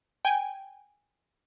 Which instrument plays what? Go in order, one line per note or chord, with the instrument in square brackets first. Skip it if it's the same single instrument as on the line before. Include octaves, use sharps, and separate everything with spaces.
[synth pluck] G5 G#5